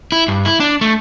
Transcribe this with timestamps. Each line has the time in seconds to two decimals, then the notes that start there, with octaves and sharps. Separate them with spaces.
0.12 E4
0.28 G2
0.45 E4
0.60 D4
0.81 A3